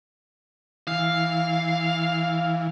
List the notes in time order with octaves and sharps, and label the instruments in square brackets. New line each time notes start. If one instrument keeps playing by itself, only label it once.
[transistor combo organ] E3 [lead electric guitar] F5